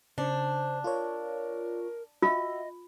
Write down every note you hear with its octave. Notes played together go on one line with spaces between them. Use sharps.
C#3 D4 C5
F4 A#4 C#5
F4 F#4 D#5 E5